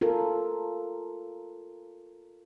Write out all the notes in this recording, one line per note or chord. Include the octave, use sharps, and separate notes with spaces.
F4 A4 A#4